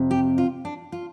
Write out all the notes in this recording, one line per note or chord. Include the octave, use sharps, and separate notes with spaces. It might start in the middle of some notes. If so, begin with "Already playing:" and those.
Already playing: F2 C3
G4
F4
D4
F4